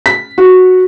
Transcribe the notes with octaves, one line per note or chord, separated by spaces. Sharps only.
B6
F#4